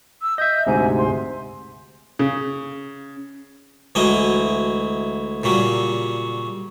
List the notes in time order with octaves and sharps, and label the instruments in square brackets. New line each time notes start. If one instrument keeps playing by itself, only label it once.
[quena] E6
[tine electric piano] D#5 E5 [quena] G6
[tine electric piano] D2 G#2 C3 [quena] G#5
[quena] C6
[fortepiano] C#3
[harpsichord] D2 E3 F#3 G#3 D#5
A#2 C#3 F#3 G3